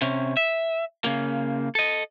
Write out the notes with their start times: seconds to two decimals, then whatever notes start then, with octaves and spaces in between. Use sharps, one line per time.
0.02 C3 C#4
0.37 E5
1.04 C#3 A#3
1.75 A4 D#5